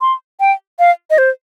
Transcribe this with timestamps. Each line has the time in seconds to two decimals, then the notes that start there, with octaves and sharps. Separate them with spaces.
0.01 C6
0.40 G5
0.79 F5
1.10 D#5
1.18 C5